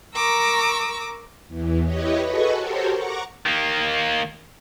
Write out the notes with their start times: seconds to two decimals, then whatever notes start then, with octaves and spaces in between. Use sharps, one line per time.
0.14 A#4 A#5 C#6 D6 E6
1.47 E2 E3
1.83 E4 G4 B4 C#5 D#5
2.23 F#4 G#4 A4 B4 D#5 C#6
2.54 F#4 G4 A4 A#4 C5 C#5
2.91 F#5 A#5 C#6 D6
3.46 D#3 A#3